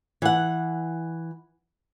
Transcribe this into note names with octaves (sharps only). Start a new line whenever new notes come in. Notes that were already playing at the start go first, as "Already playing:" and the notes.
E3 F#5